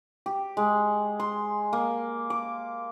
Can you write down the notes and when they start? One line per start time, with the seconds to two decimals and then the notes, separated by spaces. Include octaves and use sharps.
0.26 G4
0.57 G#3
1.20 C6
1.73 A#3
2.30 D6